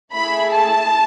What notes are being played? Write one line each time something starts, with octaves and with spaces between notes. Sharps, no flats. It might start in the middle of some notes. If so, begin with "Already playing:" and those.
A3 E4 G#4 B5
A5